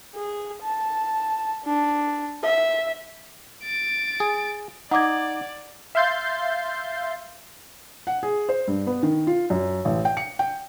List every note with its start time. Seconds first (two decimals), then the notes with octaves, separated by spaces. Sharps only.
0.15 G#4
0.62 A5
1.65 D4
2.43 E5
3.63 A6 D7
4.20 G#4
4.91 D#4 D5 D#5 F#5 D6 G#6
5.95 E5 F5 C6 G6 A6 C7
8.07 F#5
8.23 G#4
8.49 C5
8.68 G2
8.87 B3
9.03 D#3
9.27 F4
9.50 F#2
9.85 A1
10.05 G5
10.17 C#7
10.39 G5